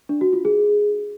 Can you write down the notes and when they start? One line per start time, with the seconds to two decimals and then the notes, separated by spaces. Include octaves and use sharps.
0.09 D4
0.21 F#4
0.33 F4
0.45 G#4